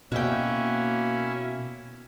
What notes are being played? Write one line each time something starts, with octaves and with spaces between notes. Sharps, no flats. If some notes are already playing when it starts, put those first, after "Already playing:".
B2 A#3 C#4 E4 F#4 G5